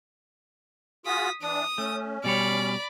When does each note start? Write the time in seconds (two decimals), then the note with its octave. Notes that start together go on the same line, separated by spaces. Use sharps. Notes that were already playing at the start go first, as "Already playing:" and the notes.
1.06 F4 F#4 G#4 D#6 B6
1.42 E3 D4 D#6
1.78 A3 C#4
2.24 B2 G3 C#5 D5 B5